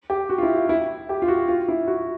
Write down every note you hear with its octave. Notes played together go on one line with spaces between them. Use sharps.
G4
F#4
F4
E4
F4
E4
G4
F4
F#4
F4
E4
F#4